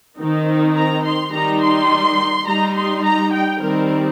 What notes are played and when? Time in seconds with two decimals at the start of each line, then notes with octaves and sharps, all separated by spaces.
0.18 D#3 C4 D#4
0.75 A#5
1.04 C6
1.32 D#3 G3 D#4 A#5
1.61 C6
2.47 G3 D#4 A#5
2.76 C6
3.04 A#5
3.34 G5
3.61 D#3 G3 C4 A#4